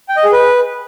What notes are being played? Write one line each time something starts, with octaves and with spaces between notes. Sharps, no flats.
G5
D#5
G#4
B4